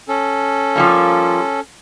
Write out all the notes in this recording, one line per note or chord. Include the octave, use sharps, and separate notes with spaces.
C#4 A4
F3 G3 A#3